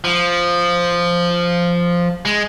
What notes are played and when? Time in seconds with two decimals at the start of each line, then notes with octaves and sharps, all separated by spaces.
0.04 F3
2.25 G#3